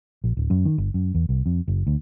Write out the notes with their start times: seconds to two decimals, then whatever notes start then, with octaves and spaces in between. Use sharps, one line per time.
0.24 A#1
0.37 D1
0.50 F#2
0.65 D#3
0.78 G1
0.94 F#2
1.15 E2
1.29 C2
1.46 F2
1.68 F#1
1.87 D2